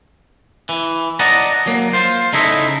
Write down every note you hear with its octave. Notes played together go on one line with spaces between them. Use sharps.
E3
D5 D#5 F#5 A5 A#5
F#3 A#3
F4 C5
C#3 D#4 E4 A4 D#5 E5